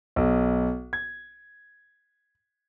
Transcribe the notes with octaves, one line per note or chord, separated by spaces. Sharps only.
B1
G#6